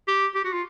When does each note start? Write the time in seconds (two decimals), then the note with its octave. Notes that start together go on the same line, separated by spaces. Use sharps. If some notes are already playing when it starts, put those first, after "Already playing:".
0.08 G4
0.35 G4
0.44 F#4
0.53 F4